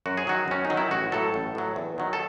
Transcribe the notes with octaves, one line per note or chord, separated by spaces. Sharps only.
F#2 F#4
G#4
D#3 F#3 F#4
F#2 C#4
D#4
D#3 F#3
E4
A1 F#4
A2 F#3 A4
A1
A2 F#3
E2
D#3 F#3
A4